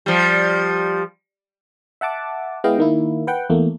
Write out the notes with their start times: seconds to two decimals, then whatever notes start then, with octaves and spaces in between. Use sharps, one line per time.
0.06 F3 G3
2.01 E5 F#5 A5 D6
2.64 G#3 B3 E4 D#5 F5 G5
2.78 D#3 A#3 E4
3.27 B4 F#5 G5
3.50 E2 A3 A#3